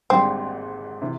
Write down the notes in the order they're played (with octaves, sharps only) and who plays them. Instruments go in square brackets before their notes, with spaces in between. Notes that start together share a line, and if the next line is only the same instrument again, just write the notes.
[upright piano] G#1 G#2 G3 [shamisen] C4
[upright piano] C3 E3